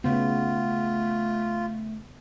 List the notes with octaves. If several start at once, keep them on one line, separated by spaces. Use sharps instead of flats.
C#3 A3 B3 F4